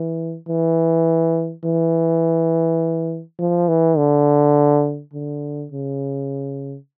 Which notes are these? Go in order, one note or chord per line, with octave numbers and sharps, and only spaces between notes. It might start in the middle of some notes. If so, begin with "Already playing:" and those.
Already playing: E3
E3
E3
F3
E3
D3
D3
C#3